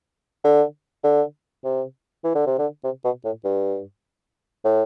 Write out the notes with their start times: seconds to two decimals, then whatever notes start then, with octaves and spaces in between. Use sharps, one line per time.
0.44 D3
1.04 D3
1.64 C3
2.24 E3
2.35 D3
2.47 C3
2.58 D3
2.84 C3
3.04 B2
3.25 A2
3.44 G2
4.64 A2